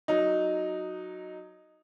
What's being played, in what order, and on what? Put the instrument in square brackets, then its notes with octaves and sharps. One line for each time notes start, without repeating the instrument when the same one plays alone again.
[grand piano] F#3 D#4